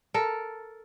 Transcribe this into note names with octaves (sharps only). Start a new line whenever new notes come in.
A4 A#4